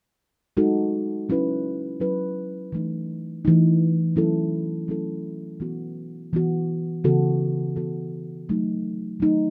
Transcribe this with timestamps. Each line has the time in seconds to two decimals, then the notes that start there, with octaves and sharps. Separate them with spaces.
0.57 G#3 D#4 F#4 A4
1.29 F#3 C#4 E4 B4
2.00 F#3 C#4 E4 B4
2.72 E3 A3 D#4
3.45 E3 A3 D#4
4.16 F#3 A3 C#4 E4 A4
4.88 F#3 A3 C#4 E4 A4
5.60 E3 B3 F#4
6.33 E3 B3 F#4
7.04 C#3 E3 B3 F#4 A4
7.76 C#3 E3 B3 F#4 A4
8.49 F#3 A3 D#4
9.20 F#3 A3 D#4